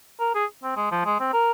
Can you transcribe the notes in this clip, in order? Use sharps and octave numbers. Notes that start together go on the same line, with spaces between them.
A#4
G#4
C4
G#3
F3
G#3
C4
A#4